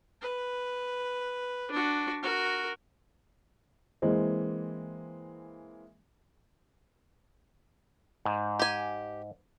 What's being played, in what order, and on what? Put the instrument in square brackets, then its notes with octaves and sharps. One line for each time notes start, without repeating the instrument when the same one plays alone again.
[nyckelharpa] B4
D4 F#4
F#4 A#4
[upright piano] E3 G#3 A#3 C4
[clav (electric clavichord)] G#2
[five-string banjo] G4 G#5